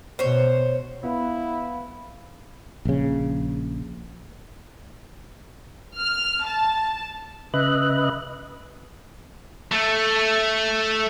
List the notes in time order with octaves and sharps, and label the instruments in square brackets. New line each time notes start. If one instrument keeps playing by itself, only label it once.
[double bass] B2 [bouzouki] C5 C#5
[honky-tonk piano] B3 [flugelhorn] E4 [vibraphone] F5 B5
[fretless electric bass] A#1 C#3
[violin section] F6
A5
[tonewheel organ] C#3 B4 D#5 E5 F#6
[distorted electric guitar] A3